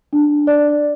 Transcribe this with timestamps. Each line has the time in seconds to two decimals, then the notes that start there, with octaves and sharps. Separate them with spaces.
0.13 D4
0.47 D5